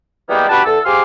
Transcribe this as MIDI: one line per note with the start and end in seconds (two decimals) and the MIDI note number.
0.29 0.47 52
0.29 0.47 55
0.29 0.47 56
0.29 0.47 58
0.29 0.47 59
0.29 0.47 67
0.49 0.63 62
0.49 0.63 66
0.49 0.63 67
0.49 0.63 71
0.49 0.63 81
0.49 0.63 83
0.65 0.78 40
0.65 0.78 69
0.85 1.02 67
0.85 1.02 68
0.85 1.02 72
0.85 1.02 77
0.85 1.02 84
0.85 1.02 86